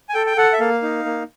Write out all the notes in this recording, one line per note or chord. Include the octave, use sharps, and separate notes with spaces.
G#5
A4 G5
G5
A4 F#5
E5
A#3 F5
D#4
A#3